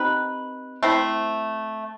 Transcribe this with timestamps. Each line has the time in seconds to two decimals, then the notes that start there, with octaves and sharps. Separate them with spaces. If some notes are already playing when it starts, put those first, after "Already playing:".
Already playing: C4 D#4 G4 B4
0.83 A3 C4 E4